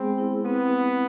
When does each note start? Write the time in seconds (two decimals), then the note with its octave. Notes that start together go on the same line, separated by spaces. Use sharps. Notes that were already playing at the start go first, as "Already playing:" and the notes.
Already playing: G#3 B3 C4 G#4
0.18 E4
0.45 B3 C4
0.71 C4